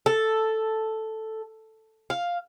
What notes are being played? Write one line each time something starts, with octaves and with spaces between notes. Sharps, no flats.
A4
F5